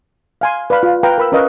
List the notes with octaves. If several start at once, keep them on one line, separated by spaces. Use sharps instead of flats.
F5 G#5 C6
B4 D5 F5 B5
F4
B4 F5 G5 A#5
A#4 B5 E6
C#4 A#4 B4 D#5 F5 C#6